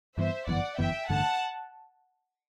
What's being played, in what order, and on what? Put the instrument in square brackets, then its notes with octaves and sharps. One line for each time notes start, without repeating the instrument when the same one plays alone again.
[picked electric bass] G2 E3 B3 [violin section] C5 E5
[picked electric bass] G1 F#2 E3 B3 [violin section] D5 F#5
[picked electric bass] G1 F#2 E3 B3 [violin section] E5 G5
[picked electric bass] A1 G2 D3 A3 [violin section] F#5 A5